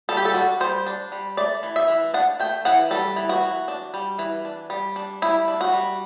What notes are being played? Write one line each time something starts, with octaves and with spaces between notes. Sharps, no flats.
G3 A4
G4
A4
D4 F#4
G3 C5
D4
G3
A3 D5
E3
E5
E3
D4 F#5
A3 G5
E3 F#5
G3 A4
E3
F#4
E3
D4
G3
E3
D4
G3
D4
G3 E4
D4
F#4
G3